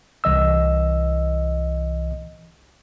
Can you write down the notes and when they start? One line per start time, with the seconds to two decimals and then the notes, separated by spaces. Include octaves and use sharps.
0.24 C2 E3 D#5 E6